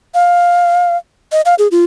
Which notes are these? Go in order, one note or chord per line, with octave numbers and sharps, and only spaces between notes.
F5
D#5
F5
G#4
F4